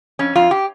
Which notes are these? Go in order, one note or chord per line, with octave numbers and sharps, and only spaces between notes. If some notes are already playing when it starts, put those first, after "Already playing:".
F2 C#4
F2 F4
G4